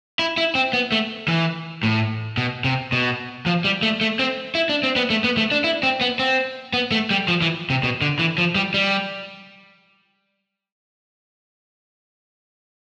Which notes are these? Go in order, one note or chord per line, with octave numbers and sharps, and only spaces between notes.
E4
E4
C4
B3
A3
E3
A2
B2
C3
B2
F3
G3
A3
A3
C4
E4
D4
C4
B3
A3
B3
A3
D4
E4
C4
B3
C4
B3
A3
G3
F3
E3
C3
B2
D3
E3
F3
G3
G3